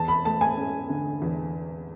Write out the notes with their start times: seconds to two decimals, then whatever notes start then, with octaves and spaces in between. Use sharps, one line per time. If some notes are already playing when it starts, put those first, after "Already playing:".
Already playing: E2 A5
0.08 B5
0.25 A3 A5
0.41 G#5
0.57 C#4
0.89 D3
1.22 E2